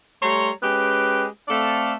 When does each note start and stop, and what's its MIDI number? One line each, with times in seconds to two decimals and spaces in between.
0.21 0.49 55
0.21 0.49 57
0.21 0.49 73
0.21 0.49 82
0.21 0.49 84
0.62 1.26 56
0.62 1.26 61
0.62 1.26 67
0.62 1.26 71
0.62 1.26 79
1.48 1.93 57
1.48 1.93 60
1.48 1.93 69
1.48 1.93 74
1.48 1.93 77